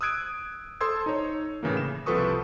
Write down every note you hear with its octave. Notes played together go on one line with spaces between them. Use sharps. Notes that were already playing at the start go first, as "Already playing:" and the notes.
D#6 E6 F#6 G#6 D7 D#7
A4 C5 C6 D#6 E6 G#6
D#4 C#5
A2 C#3 E3 A#3
E7
C2 F3 A4 B4 C#6 D#6